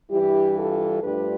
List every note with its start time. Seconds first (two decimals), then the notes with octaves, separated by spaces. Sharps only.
0.11 G2 E3 G3 E4 G4
0.57 F4 A4
1.02 G2 F3 A3 D4 G4 B4